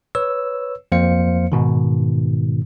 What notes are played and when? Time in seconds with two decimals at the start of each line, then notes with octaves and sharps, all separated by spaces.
0.15 B4 C#5 E6
0.92 F2 F3 A#3 C5 F5 C#7
1.52 G#2 B2 D#3